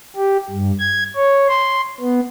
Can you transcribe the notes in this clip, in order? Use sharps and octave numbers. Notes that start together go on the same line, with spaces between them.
G4
G2
G#6
C#5
C6
B3